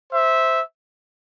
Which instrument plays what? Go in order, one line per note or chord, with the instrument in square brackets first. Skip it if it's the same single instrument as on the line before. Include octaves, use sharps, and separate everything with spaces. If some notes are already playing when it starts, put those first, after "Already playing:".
[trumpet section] C5 E5